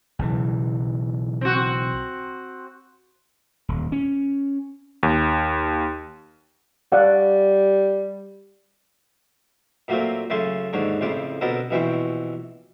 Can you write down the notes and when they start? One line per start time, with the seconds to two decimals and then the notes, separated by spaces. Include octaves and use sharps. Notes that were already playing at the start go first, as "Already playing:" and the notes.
0.19 B1 C#3 E3
1.41 C4 F#4
3.68 D#1
3.92 C#4
5.03 D#2
6.92 G3 D5 F5 F#5
9.88 A#2 F#3 A3 A#3 C4
10.30 F#2 C#3 A3 A4 G#5 C6
10.73 D#2 G#2 D3 C#5
11.01 F2 A2 C#3 G5 C6 D6
11.41 B2 D3 B3 C4 A4 A#4
11.70 A#1 B2 E3 C4 G5 C#6